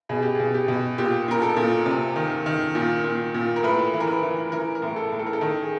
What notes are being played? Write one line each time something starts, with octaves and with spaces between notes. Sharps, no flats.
B2 G#4
G4
G#4
B2
G4
B2
A#2 G4
A#2 A#4
A4
A#2
C3
D#3
D#3
A#2
A#2
A#2
A#4
A2 B4
E3
A#4
B4
E3
E3 A#4
A#4
A2
A4
A2
A4
A#4
A4
D#3
G#4